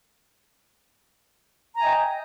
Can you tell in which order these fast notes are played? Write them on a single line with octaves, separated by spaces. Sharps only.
A#5 G#5 E5 D#5 G5